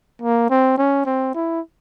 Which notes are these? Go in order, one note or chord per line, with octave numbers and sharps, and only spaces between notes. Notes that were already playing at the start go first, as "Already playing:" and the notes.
A#3
C4
C#4
C4
E4